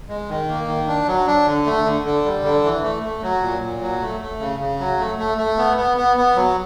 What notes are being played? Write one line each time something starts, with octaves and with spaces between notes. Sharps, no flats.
G#3
D#3
A#3
D#3
D4
F#3
D4
D3
A3
D3
D3
G3
D3
E3
A3
A3
F#3
A#2
A#2
F#3
A3
A3
C#3
C#3
F#3
A3
A3
A3
B3
B3
B3
B3
F#3